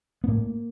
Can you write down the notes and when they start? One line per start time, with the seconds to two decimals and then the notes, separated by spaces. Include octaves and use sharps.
0.24 B3
0.28 A2 A#3